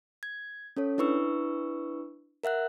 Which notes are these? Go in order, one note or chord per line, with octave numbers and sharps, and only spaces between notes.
G#6
C#4 A4 C#5
D4 E4 B4 C#6 E6
A#4 E5 F#5 F#6